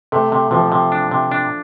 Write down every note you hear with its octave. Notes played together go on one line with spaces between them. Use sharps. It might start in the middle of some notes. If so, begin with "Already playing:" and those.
C3 A3
C3
C3 F3
C3
D4
C3
D4